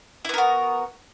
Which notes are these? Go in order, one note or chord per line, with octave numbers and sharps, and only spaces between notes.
B3 E4 F#4 A#4